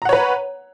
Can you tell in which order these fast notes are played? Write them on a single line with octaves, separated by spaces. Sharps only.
A#5 F#5 C#5 B4